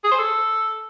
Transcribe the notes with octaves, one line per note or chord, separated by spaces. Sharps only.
G#4
C5
A4